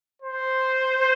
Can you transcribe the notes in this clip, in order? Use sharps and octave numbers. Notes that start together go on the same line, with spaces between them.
C5